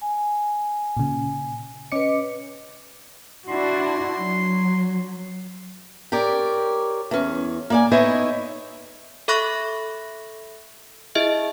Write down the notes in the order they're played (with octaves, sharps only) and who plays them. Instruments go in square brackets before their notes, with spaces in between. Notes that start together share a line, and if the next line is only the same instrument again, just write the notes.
[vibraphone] G#5
[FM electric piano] A#2 C#3
[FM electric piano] C#4 D6 C#7 [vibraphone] B4 D#5
[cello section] D4 E4 F#4 [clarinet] C6
[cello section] F#3
[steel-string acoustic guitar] G4 A#4 C#5 D5
E2 C#4
A#3 D5 G#5
B3 D#4 E4 C#5 D#5 E5
[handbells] A4 E5 B5 C#6 F#6 A#6
E4 G#4 D#5 E5